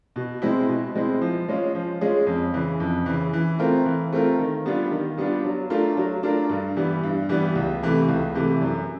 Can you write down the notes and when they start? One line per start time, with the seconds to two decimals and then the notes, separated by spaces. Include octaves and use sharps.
0.16 B2
0.42 G#3 C4 E4
0.68 B2
0.95 G#3 C4 E4
1.22 F3
1.48 G#3 C#4 F4 G#4
1.75 F3
2.01 G#3 C#4 F4 G#4
2.27 F2
2.54 C#3 E3
2.80 F2
3.06 C#3 E3
3.33 E3
3.59 A3 C4 F4 A#4
3.86 E3
4.13 A3 C4 F4 A#4
4.39 D#3
4.66 G3 B3 D4 F4
4.91 D#3
5.18 G3 B3 D4 F4
5.45 F#3
5.70 A3 D4 F4 A#4
5.97 F#3
6.23 A3 D4 F4 A#4
6.49 G2
6.77 E3 G3 B3
7.03 G2
7.29 E3 G3 B3
7.55 C#2
7.83 C3 E3 A3
8.08 C#2
8.35 C3 E3 A3
8.61 F#2